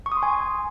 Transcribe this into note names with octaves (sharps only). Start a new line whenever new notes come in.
C#6
D#6
C6
G#5